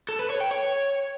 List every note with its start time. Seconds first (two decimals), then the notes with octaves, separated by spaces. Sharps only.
0.09 A4
0.19 B4
0.30 C#5
0.41 G5
0.51 C#5